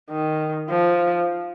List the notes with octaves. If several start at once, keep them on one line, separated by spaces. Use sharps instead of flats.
D#3
F3